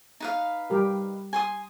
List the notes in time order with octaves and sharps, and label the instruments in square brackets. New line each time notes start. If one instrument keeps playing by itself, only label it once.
[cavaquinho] D#4 B4 F5
[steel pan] G3 G4 A#4
[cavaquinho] G#5 C6 D#6